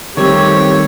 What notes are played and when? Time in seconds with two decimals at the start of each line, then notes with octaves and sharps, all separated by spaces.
0.17 D#3 G3 A3 C4 G4 C#5